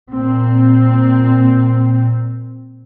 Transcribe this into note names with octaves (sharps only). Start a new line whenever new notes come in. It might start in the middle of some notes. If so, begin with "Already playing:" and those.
A#2 C4